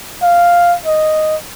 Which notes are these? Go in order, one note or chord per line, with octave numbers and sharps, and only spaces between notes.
F5
D#5